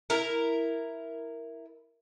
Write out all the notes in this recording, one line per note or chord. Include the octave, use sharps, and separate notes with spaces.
E4 A#4